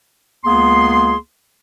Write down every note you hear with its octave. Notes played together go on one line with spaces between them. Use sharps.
C#2 A#3 B3 G#4 C6